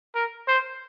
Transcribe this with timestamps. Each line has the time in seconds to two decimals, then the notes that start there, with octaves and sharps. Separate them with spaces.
0.15 A#4
0.48 C5